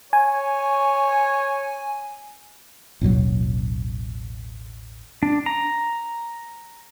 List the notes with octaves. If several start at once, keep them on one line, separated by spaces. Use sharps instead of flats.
C#5 G#5
A1 D#2 B2 F#3
D4
A#5